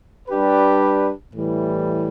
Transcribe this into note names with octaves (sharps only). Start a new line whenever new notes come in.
G3 D4 G4 B4
A2 E3 G3